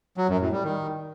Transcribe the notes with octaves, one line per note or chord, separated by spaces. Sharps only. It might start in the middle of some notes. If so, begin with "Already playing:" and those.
F#3
F#2
A2
G3
D#3